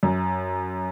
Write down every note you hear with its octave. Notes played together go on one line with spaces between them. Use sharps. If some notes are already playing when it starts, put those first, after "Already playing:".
F#2